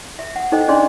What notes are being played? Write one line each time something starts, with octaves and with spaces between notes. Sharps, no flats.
E5
F#5
D#4 A4 C5 D#5 G5
C#4 D4 G#4 D5 D#5 C6